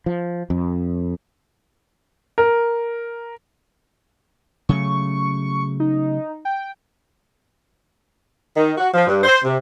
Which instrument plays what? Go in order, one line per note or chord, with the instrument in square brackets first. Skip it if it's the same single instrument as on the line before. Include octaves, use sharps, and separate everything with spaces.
[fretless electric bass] F3
F2
[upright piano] A#4
[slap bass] C#3 F#3 A3 [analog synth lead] C#6
[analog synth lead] D#4
G5
[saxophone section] D#3
F#4
F3
G2
C5
C3